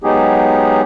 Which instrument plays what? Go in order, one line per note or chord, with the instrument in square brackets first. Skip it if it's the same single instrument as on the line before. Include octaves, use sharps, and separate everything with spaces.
[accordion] F#3 G#3 B3 D#4 G4 G#4